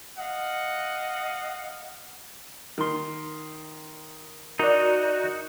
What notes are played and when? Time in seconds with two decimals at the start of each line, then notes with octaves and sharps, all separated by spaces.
0.17 D#5 F5 F#5
2.78 D#3 C6
4.59 D#4 F#4 A#4 D5